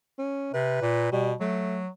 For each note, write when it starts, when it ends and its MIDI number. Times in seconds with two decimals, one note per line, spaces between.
0.19 0.52 61
0.54 0.79 48
0.54 1.11 71
0.82 1.11 46
1.12 1.34 47
1.12 1.32 55
1.40 1.88 54
1.40 1.82 57